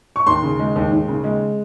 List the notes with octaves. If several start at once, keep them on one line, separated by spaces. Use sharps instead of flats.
C#6
D#2 C6
C#3
G#3
D#2
D#2
C#3
G#3